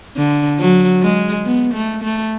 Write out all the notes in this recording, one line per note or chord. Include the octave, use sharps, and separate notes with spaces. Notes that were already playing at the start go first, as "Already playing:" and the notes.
D3
F#3
G#3
B3
A3
A3